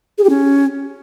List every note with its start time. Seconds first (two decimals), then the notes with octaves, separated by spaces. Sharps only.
0.18 G#4
0.24 G4
0.29 C#4